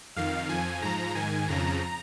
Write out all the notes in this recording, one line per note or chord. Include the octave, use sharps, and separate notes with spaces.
F2 D#3 F5
F2 F3 G#5
G#2 F3 A#5
G#2 D#3 G#5
F2 C#3 F3 A#5